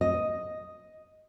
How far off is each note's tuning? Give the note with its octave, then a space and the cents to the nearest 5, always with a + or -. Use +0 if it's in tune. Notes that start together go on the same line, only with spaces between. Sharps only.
D#5 +0